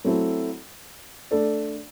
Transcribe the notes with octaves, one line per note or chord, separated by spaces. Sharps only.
F#3 A3 C4 E4 A4
A3 D4 A4 D5